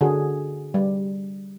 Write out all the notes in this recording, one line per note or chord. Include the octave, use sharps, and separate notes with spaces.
D3 F#4 G#4
G3